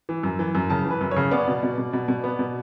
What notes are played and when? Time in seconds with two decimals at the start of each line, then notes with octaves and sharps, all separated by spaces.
0.09 E3
0.23 F#2
0.39 E3
0.55 F#2
0.70 C#3 A5
0.85 E3
0.91 B4
1.01 F#2
1.11 C#3 C#5
1.31 B3 D5
1.48 B2
1.63 B2
1.78 B2
1.93 B2
2.08 B2
2.24 B3
2.39 B2